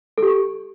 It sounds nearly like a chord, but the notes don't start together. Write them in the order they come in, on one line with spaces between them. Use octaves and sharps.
A4 G4 C#6